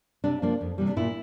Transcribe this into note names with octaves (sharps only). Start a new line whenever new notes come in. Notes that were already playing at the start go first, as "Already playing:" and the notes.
C3 D4
F3 A#3 D4
F2
C3 E3 G3
D4
A#2 E4